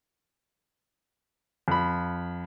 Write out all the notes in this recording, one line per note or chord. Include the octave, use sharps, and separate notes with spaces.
F2 B5